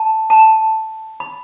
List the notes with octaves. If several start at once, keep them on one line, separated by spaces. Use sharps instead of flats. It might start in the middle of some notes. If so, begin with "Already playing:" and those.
Already playing: A5
A5
B5